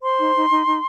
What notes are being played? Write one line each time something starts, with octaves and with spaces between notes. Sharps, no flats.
C5 C6
D#4
D#4
D#4
D#4